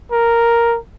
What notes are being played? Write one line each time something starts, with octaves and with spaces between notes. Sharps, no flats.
A#4